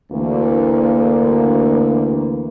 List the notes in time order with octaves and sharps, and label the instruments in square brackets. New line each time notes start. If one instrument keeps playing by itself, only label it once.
[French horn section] D2 E3 A#3